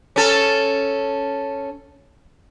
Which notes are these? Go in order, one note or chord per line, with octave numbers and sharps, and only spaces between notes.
C#4 A4